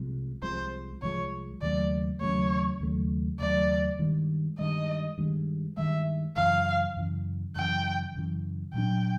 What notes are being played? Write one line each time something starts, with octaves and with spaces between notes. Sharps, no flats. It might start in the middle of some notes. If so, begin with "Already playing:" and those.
Already playing: C2 C3 F3 G#3
C2 C3 F3 G#3 C5
C2 C3 F3 G#3 C#5
D#2 C#3 F#3 A3 D5
D#2 C#3 F#3 A3 C#5
D#2 C#3 F#3 A3
D#2 C#3 F#3 A3 D5
G2 D#3 G#3
G2 D#3 G#3 D#5
G2 D#3 G#3
G2 D#3 G#3 E5
F#2 C#3 E3 F5
F#2 C#3 E3
F#2 C#3 E3 G5
F#2 C#3 E3
A#2 F#3 B3 D4 G5